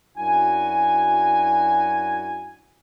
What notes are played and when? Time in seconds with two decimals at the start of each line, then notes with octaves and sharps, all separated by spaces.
0.18 F#2 D4 E4 F#4 G#5